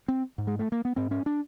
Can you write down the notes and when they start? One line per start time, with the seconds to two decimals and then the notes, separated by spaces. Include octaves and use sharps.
0.08 C4
0.38 G#2
0.47 G#3
0.59 A3
0.72 A#3
0.85 B3
0.96 G#2 C4
1.11 C#4
1.26 D4